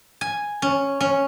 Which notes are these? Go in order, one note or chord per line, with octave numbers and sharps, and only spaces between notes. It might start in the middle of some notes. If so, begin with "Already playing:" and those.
G#5
C#4
C#4